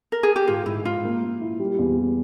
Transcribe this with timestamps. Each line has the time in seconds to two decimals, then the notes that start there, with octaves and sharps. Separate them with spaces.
0.12 A#4
0.23 G#4
0.36 G4
0.48 G#2 F4
0.66 G#2 E4
0.85 G#2 F4
1.04 A#3
1.23 A#3
1.41 E4
1.59 G3
1.79 E2
1.97 G3